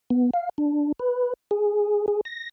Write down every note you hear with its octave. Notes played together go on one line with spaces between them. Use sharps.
B3
F5
D4
B4
G#4
G#4
A#6